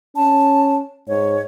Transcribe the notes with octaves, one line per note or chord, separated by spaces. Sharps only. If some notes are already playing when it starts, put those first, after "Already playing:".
C#4 A5
G#2 C#5